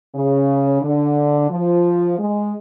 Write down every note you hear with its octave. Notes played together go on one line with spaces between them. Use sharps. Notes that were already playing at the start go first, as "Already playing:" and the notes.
C#3
D3
F3
G#3